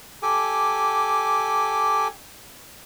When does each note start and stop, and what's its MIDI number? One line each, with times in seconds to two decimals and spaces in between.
0.23 2.08 67
0.23 2.08 69
0.23 2.08 80
0.23 2.08 86